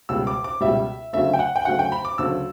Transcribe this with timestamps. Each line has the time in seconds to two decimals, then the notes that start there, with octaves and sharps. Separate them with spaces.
0.09 C#2 B2 G3 E6
0.27 D6
0.44 D6
0.61 C#2 B2 G3 E5
1.13 D2 C#3 F#3 A3 E5
1.33 G5
1.39 F#5
1.56 G5
1.65 D2 C#3 F#3 A3 F#5
1.79 G5
1.92 B5
2.05 D6
2.18 D2 C#3 F#3 A3 E6